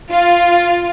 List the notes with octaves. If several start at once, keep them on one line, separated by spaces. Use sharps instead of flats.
F4